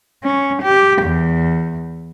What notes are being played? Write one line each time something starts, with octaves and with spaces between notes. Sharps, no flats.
C#4
G4
E2